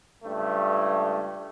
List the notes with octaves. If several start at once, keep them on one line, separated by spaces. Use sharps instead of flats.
C#2 G2 A3